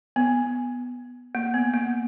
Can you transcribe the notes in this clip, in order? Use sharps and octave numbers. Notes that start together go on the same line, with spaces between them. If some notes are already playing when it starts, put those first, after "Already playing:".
B3
A#3
B3
A#3